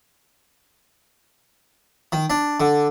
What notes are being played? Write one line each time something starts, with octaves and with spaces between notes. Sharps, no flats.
D#3
D4
D3